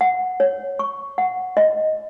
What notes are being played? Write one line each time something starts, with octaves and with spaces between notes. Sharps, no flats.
F#5
C#5
C#6
F#5
D#5